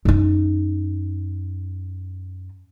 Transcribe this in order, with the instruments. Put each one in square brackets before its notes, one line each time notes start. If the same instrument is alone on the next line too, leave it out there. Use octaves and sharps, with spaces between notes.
[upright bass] F#2 D#4